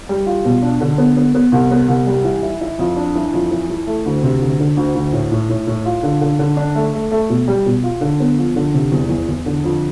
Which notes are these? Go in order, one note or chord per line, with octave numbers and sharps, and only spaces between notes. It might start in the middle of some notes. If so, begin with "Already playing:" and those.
G3
F4
B2
D4
D3
B3
B3
B3
C2
B3
C2
G3
E3
E4
E4
F2
D4
E3
F2
E3
E3
A3
D2
C3
D2
D3
D2
D2
A2
A2
A2
A2
F4
D3
D3
D3
D4
A3
A3
A3
B2
G3
B2
F4
D3
B3
F3
D3
C3
E2
E2
E2
D3
F2